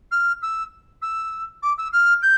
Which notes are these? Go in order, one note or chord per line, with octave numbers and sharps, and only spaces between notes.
F6
E6
E6
D6
E6
F6
G6